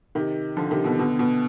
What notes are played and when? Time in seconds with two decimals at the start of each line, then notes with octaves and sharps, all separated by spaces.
0.15 C3 D#3
0.57 D3 F3
0.71 C3 D#3
0.84 B2 D3
0.98 B2 D3
1.19 B2